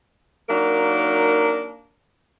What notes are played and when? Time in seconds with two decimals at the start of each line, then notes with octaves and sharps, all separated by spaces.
0.49 F#3 A#3 D4 D#4 A#4